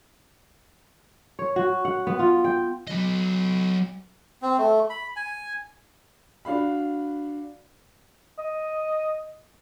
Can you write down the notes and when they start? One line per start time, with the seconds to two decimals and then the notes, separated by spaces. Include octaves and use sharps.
1.39 C#5
1.56 F#4
1.85 F#5
2.07 B3
2.19 F4
2.44 G5
2.88 F#3 D#5
4.42 C4
4.58 A3
4.90 B5
5.16 G#5
6.45 D4 F#4 F5 B5
8.38 D#5